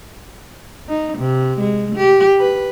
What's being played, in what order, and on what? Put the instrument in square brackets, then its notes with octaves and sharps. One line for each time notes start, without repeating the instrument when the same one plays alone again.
[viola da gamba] D#4
C3
G#3
G4
B4